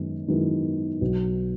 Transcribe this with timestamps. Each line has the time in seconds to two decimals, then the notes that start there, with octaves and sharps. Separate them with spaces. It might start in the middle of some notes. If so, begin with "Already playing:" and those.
Already playing: F#2 D#3 G#3 B3
0.28 F#2 D#3 G#3 B3 E4
1.01 B1 B2 F#3 B3